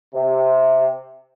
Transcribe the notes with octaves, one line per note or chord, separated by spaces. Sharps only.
C3